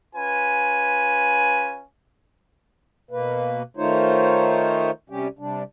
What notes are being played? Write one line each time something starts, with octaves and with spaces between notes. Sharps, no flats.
C#4 F4 B4 G#5
B2 A#3 B4
D#3 A3 D#4 F4 C5 C#5
C3 G3 C#4 G4
C3 G3 D4